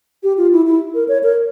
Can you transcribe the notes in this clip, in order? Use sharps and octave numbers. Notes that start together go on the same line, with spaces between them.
G4
F4
E4
E4
A#4
C#5
A#4